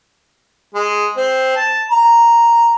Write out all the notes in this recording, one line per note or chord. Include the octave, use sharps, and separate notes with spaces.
G#3
C4
A5
A#5